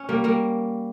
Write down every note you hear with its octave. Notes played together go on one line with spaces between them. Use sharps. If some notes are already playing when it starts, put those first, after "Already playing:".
Already playing: C#4
G3 A#3
G3 A#3